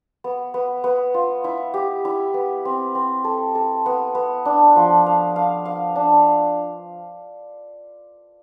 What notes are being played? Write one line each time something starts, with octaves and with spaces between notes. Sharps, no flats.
B3
B3
B3
F4
E4
G4
E4
B3
C4
C4
A4
A4
B3
B3
D4
F3
F5
F5
F5
D4